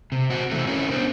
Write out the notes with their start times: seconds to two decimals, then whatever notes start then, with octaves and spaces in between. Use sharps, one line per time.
0.12 C3
0.30 C4 F#4
0.51 C3 E3 A3 C4
0.67 C#4 E4 F4 A#4 C#5
0.91 B3 D4 C5